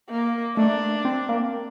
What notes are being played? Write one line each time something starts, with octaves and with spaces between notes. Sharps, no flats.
A#3
A3 D4
C4
A#3